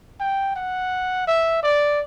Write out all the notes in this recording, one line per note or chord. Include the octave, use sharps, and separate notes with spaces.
G5
F#5
E5
D5